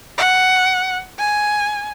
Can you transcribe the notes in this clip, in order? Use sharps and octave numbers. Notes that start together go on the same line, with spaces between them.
F#5
G#5